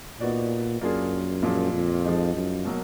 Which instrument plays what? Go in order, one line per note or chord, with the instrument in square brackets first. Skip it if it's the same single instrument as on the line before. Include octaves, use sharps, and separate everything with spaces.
[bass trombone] A#2 [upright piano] B3 D#4 F#4 D5
[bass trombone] F#2 [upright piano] A#3 D4 F4 G#4
[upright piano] A#2 F3 G#3
[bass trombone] F2
[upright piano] F3 G#3 D#4
[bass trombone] F#2
[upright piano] B2 F#3 A#3